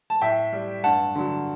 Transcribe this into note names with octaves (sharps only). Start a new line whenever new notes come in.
A5
A2 E5 G5
G3
G2 F#5 A5
D3 F#3